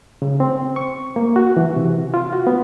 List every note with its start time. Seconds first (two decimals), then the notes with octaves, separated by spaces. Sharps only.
0.22 C#3
0.40 C4
0.76 C#6
1.16 A#3
1.36 F#4
1.57 E3
1.76 C3
2.14 F4
2.33 F#4
2.47 B3